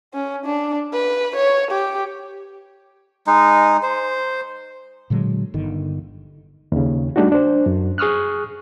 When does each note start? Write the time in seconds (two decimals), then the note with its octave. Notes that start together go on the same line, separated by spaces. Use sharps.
0.14 C#4
0.46 D4
0.93 B4
1.36 C#5
1.71 G4
3.27 G#3 D#4
3.83 C5
5.10 A#2 D3 F#3 G#3
5.54 G1 D3 D#3
6.72 D#2 C#3
7.16 G3 A3 D4 D#4 F#4
7.32 D4 C5
7.66 F#2
7.98 G#4 C#6 D#6 F6 F#6